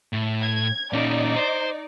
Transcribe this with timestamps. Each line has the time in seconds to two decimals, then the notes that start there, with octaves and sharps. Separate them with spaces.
0.13 A2
0.41 G#6
0.93 A#2 C#4 D#4 D5
1.36 C5